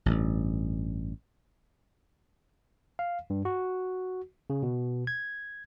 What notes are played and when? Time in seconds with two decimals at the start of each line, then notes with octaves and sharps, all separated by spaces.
0.06 A1 G2
2.99 F5
3.30 G2
3.45 F#4
4.50 C#3
4.63 B2
5.07 G#6